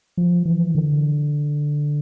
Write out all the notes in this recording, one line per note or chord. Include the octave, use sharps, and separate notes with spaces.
F3
E3
D3